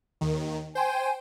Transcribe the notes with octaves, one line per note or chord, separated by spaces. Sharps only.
D#2 D#3
C5 G5 G#5